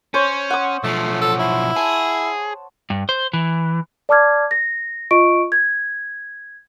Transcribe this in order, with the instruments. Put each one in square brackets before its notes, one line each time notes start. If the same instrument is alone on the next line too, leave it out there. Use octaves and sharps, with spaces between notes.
[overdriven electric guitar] C#4 [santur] C5 C#5
[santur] F#5 D#6
[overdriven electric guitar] B1 F3 [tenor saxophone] A3
[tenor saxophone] A4
E4
[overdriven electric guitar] G#4 [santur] A5
[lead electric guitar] G2
C5
E3
[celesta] D5 A5 D6 F6 G#6
A#6
F4 D#5 C#6 D7
G#6